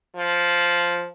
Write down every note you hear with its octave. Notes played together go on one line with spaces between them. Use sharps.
F3